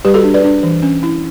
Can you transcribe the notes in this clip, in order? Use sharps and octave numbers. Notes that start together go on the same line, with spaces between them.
G3 G4 B4
F#4 A4
D4
B4 D5
D4
E3
C#4
E4